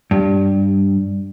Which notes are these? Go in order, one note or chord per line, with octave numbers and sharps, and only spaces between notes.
G2